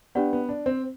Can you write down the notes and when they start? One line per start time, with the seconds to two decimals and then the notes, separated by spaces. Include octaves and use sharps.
0.15 B3 D4 G4 B4 D5 F#5
0.33 B3
0.49 D4
0.66 C4